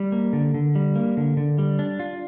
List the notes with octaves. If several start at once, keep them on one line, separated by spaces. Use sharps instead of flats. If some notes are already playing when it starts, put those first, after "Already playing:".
Already playing: G3
A#3
D3
D3
G3
A#3
D3
D3
G3
D4
F4